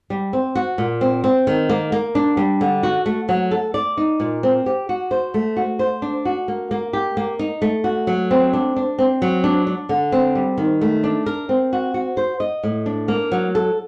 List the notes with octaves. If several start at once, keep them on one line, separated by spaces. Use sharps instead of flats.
G3
C4
F#4
A#2
C4
C4
D#3
A#3
A#3
D4
G3
D3
F#4
A3
F#3
A4
D5
D#4
A#2
C4
G4
F#4
C5
A3
F#4
C5
D4
F#4
A#3
A#3
G4
A#3
D#4
A3
F#4
F#3
C4
D4
D4
C4
F#3
D4
D4
D3
C4
G3
D#3
A3
D4
A#4
C4
F#4
F#4
C5
D#5
A2
D4
A#3
F#3
A4